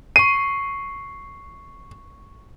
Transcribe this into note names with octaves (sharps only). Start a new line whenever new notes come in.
C#6 C7 D#7